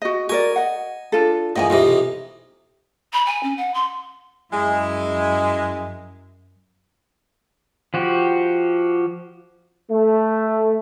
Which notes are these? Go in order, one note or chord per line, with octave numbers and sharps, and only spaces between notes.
F#4 D#5
F#4 A#4 D5 G#5
D#5 F#5
D4 F4 A4
E2 A#2 D#5 G5 G#5
B1 C3 E3 F4 D#5
B5
G#5
C#4
F#5
C6
F#2 G#3 E4
F3 F#4 G4
A3